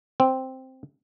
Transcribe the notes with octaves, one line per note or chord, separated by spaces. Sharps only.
C4